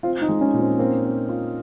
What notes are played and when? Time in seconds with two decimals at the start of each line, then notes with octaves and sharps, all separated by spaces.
0.03 C4 F4
0.22 D#4
0.28 G#3
0.41 C#4
0.54 A#2
0.60 C4
0.79 A#3 C4
1.04 C4
1.29 F4